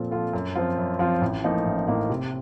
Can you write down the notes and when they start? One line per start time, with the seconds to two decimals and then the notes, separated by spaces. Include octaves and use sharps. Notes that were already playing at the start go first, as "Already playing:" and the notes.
Already playing: A#2 F3 C4 F4 A4
0.11 F3 C4 F4 A4
0.33 F#2
0.55 F3 C4 F4
0.78 F#2
0.99 F3 C4 F4
1.21 A1
1.44 A2 F3 A#3 D#4
1.65 A1
1.87 A2 F3 A#3 D#4
2.10 C3